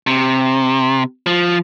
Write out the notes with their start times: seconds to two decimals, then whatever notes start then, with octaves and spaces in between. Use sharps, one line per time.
0.07 C3
1.26 F3